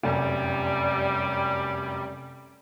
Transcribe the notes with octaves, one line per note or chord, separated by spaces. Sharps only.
F1 F#2 G3